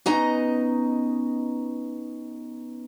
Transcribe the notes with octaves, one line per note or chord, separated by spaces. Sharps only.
B3 C#4 D#4 D#5 A#5